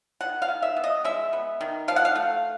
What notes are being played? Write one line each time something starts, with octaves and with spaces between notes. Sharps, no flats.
D#3 F#5
F5
D#3
E5
B3
D#5
G#3 E5
B3
D#3
F3 F5
F#5
F5
A3